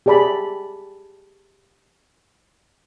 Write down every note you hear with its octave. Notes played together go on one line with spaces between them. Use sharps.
G4 G#4 D5 A5 B5